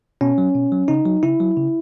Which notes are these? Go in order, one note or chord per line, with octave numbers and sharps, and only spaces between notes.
B2 C#4
F#3
B2
F#3
C#3 D#4
F#3
C#3 E4
F#3
C#3